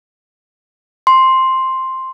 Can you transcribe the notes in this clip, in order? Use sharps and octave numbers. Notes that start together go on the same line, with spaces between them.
C6